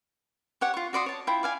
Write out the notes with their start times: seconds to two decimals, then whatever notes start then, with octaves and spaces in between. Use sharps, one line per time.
0.61 G4 C#5 F#5
0.74 F4 C#6
0.93 F#4 D5 C6 D#6
1.06 C#5 A5
1.27 E4 F4 G5
1.43 D5 F5 G#5